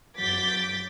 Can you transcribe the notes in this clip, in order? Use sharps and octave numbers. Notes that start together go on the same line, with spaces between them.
F#2 F#3 D6 G6 A6 B6